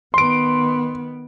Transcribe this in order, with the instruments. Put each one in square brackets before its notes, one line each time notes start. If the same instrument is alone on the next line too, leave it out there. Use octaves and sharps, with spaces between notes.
[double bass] D#3 B3 [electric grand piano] C6 D7